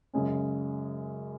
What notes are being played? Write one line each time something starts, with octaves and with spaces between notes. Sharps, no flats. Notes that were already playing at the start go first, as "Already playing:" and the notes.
F#2 C#3 G#3 C#4